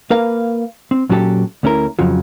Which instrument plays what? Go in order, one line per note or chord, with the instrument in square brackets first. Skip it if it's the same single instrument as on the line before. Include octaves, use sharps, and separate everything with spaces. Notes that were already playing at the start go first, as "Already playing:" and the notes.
[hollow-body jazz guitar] A#3 A#4 B4 F5
C4
A#2 F#3 C#4 F#4 G4 A4
D2 A3 C#4 E4 A#4
F2 C#3 F3 F#3